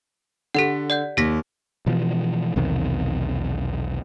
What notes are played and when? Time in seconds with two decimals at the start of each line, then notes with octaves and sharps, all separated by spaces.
0.55 D3 G4 A4 F#5 B6
0.90 D5 F#5 G6
1.17 D#2 G4 A#6 B6
1.86 B2 E3 F3
2.56 B1 E2 C3 D#3